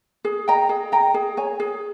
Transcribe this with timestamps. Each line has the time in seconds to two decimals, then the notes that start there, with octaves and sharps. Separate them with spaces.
0.25 G#4
0.48 D#5 G5 A#5
0.69 G#4
0.92 D#5 G5 A#5
1.14 G#4
1.37 C#5 G#5
1.60 G#4